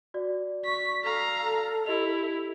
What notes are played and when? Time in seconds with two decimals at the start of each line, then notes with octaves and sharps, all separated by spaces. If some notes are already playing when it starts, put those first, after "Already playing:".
0.14 F#4 D5
0.65 C#6 B6
1.04 A4 F5 A#5
1.86 E4 G4 D#5 F7